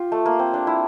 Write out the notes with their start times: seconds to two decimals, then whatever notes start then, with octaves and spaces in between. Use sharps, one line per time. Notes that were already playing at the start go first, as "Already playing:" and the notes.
Already playing: F4 G4
0.12 A3
0.26 A#3
0.39 C4
0.54 D4
0.67 E4